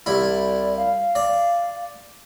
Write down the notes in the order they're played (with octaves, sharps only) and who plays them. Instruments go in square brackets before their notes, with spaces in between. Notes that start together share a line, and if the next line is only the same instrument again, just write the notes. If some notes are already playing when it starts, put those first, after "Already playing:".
[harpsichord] C2 E4 [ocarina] D5
[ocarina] F5
[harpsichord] D5